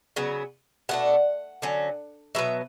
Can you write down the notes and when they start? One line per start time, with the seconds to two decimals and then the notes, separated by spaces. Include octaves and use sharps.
0.16 C#3 F#3 B3
0.89 B2 A3 D4 F#5
1.62 D3 F#3 C#4
2.35 B2 F#3 B3 E5